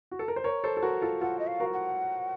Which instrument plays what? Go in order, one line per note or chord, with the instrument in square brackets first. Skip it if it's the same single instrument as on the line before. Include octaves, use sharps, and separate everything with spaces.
[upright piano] F#4
A4
A#4
C5
A#4 C#5
A4 C5
A4
F#4 A#4
F4 A4
[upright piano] F4 A4 [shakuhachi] F#5
[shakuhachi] D#5
F5
[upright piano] F#4 A#4
[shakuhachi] F#5